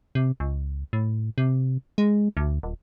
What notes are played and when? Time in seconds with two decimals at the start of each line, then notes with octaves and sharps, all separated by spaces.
0.15 C3
0.40 C#2
0.93 A2
1.38 C3
1.98 G#3
2.37 D2
2.63 D#1